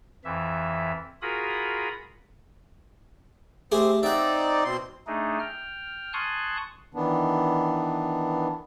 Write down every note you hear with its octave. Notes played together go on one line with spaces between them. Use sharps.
F2 E3 E5
F4 F#4 G#4 A#4 B5 D#6
A3 C4 G4 G#4
C4 D#4 D5 E5 F#5
B2 C4 C6
A3 D4 D#4 G#4
G5 F6
G#5 A5 C6 C#6 D#6 F#6
D#3 E3 B3 D4